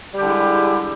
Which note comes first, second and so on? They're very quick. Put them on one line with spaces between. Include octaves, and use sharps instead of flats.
G3 G4 D3 E4 G#3